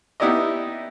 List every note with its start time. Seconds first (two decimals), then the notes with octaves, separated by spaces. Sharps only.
0.20 B3 D#4 E4 G4 D5 D#5